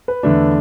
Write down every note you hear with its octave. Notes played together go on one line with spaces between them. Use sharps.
B4
E2 D3 A3 D4